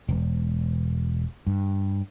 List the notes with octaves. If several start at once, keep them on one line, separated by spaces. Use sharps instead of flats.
E1
G2